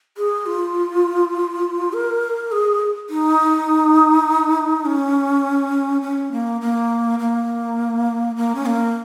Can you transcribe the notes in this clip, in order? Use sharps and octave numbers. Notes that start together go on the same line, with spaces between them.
G#4
F4
A#4
G#4
D#4
C#4
C#4
A#3
A#3
A#3
A#3
C#4
A#3